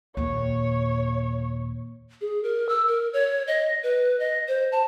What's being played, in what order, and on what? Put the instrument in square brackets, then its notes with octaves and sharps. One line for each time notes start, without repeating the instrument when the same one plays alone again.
[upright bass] D#2 A#2 [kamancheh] C#5
[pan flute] G#4
A#4
E6
A#4
C#5
D#5
B4
D#5
C5
A5